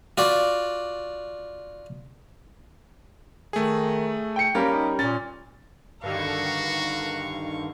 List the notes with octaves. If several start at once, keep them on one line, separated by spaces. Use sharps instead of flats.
F4 F#4 D5
D#3 A3 G#4
G5 C#7
G3 A#3 C#4 G4 A#4
D#4
A#2 C#4 A6
G2 D3 D#3 F#4 F5 A#5 C#6